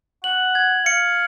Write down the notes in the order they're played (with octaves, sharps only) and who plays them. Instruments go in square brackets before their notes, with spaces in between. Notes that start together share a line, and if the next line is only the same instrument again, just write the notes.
[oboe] F#5 [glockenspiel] F#7
[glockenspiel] G#6
[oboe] F5 [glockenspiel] C#7